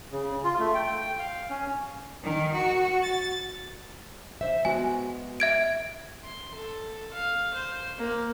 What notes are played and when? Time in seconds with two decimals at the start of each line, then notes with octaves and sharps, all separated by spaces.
0.12 C#3
0.44 F4
0.59 A3
0.74 G5
0.95 G5
1.19 F5
1.50 C#4
2.23 D#3
2.53 F#4
3.02 A6
4.41 C5 E5
4.65 G#3 B3 F#4 G#5
5.40 E5 G#6 D7
6.24 C6
6.54 A4
7.14 F5
7.54 C5
7.98 A#3